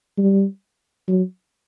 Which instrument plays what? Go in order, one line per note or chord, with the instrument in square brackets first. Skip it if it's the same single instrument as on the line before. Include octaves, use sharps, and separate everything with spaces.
[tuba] G3
F#3